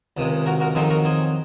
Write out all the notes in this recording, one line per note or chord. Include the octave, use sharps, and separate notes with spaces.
C#2 C3 D#3 G#3
F#4 A#4
F#4 A#4
F2 D#3 F#3 C4 D#4 G#4 C5
F#4 A#4
G#4 C5